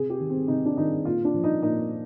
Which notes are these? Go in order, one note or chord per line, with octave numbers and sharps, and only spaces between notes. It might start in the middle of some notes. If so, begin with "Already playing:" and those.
Already playing: C3 G#4
G4
D#3
C4
C3 D#4
D4
D#3 D#4
A#2 F4
D4
F3
D#4
A#2 D#4